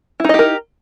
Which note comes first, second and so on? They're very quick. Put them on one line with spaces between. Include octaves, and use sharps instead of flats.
E4 D#4 D#5 G4 A#4